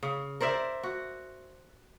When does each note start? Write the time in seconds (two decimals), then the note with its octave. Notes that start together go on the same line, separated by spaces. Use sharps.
0.03 C#3
0.40 A#4 C5 D5 E5
0.83 F#4